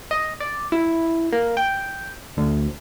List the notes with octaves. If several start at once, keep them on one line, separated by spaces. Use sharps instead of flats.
D#5
D5
E4
A#3
G5
D2